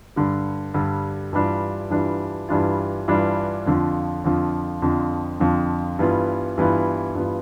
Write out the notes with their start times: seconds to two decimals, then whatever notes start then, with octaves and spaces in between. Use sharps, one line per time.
0.16 G2 D3 G3
0.74 G2 D3 G3
1.33 G2 E3 G3 D4 F4
1.90 G2 E3 G3 D4 F4
2.49 G2 E3 G3 D4 F4
3.08 G2 E3 G3 D4 F4
3.66 F2 D3 F3
4.24 F2 D3 F3
4.82 F2 D3 F3
5.40 F2 D3 F3
5.99 G2 E3 B3 F4
6.58 G2 E3 B3 F4
7.15 G2 E3 B3 F4